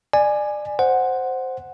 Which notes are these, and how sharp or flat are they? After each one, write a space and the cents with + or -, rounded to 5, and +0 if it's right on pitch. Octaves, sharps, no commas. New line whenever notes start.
D5 +25 G#5 +0
C5 +0 F#5 +0